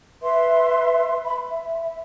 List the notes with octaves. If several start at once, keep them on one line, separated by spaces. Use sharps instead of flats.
B4 E5 C6
B5
E5